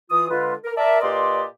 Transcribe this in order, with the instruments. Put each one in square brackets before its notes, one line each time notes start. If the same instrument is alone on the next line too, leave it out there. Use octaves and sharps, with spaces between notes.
[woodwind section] E3 F4 D#6
D3 G#3 F4 B4
A#4
A#4 D5 E5 A5
A#2 G4 B4 D5 D#5 C6